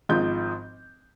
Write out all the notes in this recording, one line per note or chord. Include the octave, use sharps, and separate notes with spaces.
G#1 G#2 F3 G6